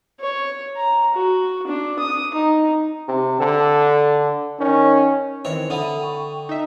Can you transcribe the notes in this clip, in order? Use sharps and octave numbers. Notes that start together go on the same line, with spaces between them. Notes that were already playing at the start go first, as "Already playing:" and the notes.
C#5
A#5
F#4
D4
D#6
D#4
C3
D3 A4
D#3 C#4
D#3 E3 C4 C#5
D3 E5 F#5 B5 D#6
G5 C#6
D#4 D#5 E5